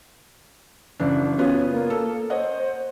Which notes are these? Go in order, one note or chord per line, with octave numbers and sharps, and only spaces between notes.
F#1 E3 D4
C#3 B3 F4 C#5
A#3
A4
C5 C#5 D#5 F#5